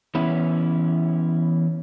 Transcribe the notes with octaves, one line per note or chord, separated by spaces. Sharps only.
E3 B3 C#4 E4